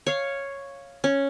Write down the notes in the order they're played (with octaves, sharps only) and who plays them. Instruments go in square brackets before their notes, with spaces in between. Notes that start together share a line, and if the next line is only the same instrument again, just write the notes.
[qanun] C#5 F5
C#4